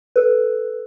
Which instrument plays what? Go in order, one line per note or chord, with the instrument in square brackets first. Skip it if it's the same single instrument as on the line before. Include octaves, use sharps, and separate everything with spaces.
[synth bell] A4 B4